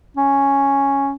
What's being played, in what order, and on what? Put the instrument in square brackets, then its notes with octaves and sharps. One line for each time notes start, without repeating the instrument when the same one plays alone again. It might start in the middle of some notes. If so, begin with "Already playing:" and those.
[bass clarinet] C#4